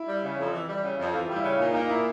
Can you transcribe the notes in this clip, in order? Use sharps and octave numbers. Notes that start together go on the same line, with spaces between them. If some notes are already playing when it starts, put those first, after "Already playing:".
Already playing: E4
G3
C#3
F2
E3
G3
C#3
F2
E3 F4
G3
E4
C#3
A#2 D#4
A#3 D#4
A#2 E4